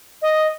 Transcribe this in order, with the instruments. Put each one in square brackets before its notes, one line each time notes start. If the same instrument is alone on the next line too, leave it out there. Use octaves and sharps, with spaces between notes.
[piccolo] D#5